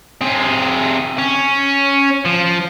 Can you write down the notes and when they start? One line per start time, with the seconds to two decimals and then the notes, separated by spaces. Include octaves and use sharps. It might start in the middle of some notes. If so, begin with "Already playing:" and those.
0.21 C3 G#4
1.19 C#4
2.25 F3